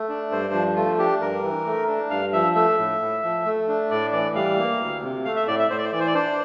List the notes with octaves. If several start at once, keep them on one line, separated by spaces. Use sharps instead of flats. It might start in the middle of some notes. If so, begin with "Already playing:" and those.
Already playing: A3
D4
G2 C5
F3
A3 F4
D4 G4
G2 A#4
E3
A3
D4
G2 F5
F3 E5
A3 E5
A2
A2
F3
A3
D4
A2 D5
E3 D5
G3 F5
A#3
D2
C3
A3 F5
E5
A2 D5
E5
A2 C5
D5
C5
E3 D5
C5
D5
D4 C5